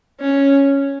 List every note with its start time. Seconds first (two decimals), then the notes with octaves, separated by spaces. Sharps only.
0.21 C#4